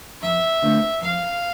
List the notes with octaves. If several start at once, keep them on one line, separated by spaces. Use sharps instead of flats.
F2 E5
D3 A3 C4 F4
F2 F5